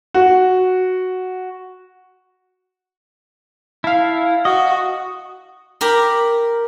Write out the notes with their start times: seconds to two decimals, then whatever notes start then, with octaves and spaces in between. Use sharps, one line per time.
0.14 F#4
3.84 E4 F5 A5
4.45 F#4 D#5
5.81 G4 A#4 B5